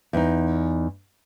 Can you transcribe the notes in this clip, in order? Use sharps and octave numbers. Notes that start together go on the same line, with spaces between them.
E2 D#4